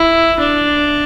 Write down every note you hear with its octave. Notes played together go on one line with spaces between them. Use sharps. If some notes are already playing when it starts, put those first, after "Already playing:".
Already playing: E4
D4